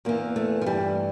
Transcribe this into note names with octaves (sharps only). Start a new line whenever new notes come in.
E2 E3 A#3
A3
F3
G2 E3 G3